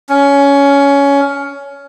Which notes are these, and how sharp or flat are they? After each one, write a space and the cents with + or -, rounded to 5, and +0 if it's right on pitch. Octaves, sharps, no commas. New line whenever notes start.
C#4 +15